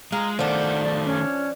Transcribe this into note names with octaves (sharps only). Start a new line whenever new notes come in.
G#3 F4 A#5
D#3 F3 A3 D4 F#5
D5
C#4